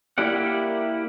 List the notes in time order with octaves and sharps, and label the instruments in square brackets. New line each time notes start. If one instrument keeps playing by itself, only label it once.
[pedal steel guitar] A#3 E4 G4 D5 F#5